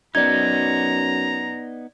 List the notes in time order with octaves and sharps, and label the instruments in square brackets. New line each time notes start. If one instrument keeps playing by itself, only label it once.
[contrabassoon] F#2 [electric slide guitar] B3 D#4 [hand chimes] D5 G#6 [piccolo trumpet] A#5